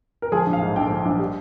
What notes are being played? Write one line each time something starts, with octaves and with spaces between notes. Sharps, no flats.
A#4
F3 G#4
A#1
F5
G#2
A#1 G5
F3
A#1
G3